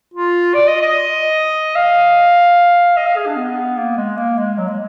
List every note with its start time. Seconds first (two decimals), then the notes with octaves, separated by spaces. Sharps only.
0.14 F4
0.54 D5
0.68 D#5
0.82 D#5
1.75 F5
2.97 D#5
3.06 F5
3.16 G#4
3.27 D4
3.36 B3
3.77 A#3
3.97 G#3
4.17 A#3
4.37 G#3
4.58 F#3
4.67 G#3